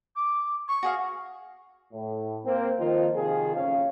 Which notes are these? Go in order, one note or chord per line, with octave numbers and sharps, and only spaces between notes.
D6
C#6
F#4 G#4 F5
A2
A#3 C4
D#3 F3 A#3 C4 D#4 F4
C3 D#3 F3 D#4 G#4
F#1 F2 C#4 F5